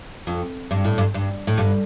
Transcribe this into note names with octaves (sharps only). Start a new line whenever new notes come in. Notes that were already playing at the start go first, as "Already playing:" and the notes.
F2
G2
A2
G2
G2
A2
G2